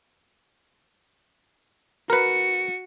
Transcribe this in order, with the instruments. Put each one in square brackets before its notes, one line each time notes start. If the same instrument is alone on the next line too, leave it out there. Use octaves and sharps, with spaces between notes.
[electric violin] F#4 C#7 [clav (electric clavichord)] A#4 B4